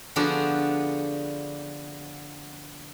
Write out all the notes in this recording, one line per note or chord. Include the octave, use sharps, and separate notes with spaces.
D3 F3 B3 D4 F#4 G#4